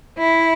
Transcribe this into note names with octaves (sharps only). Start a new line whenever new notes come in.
E4